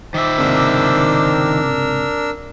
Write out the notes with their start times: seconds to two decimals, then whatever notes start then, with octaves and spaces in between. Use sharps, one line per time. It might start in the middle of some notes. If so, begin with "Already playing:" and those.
0.14 D#3 C5 E5 D6
0.38 C#2 G#2 C3 D4 A#4 E6